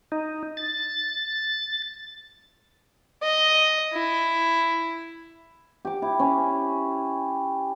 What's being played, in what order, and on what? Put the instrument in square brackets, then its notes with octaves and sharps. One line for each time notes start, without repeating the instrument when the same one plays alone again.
[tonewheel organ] D#4
A6
[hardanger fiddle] D#5
E4
[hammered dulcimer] G4 D6
E4
C#4